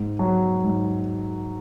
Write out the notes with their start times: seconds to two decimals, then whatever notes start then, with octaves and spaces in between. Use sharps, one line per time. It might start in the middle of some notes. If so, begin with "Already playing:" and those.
Already playing: G#2
0.19 F#3
0.64 G#2